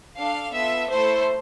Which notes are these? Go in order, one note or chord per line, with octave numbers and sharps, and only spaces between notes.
D4 A4 F5
B3 F4 A4 E5
A3 E4 A4 C5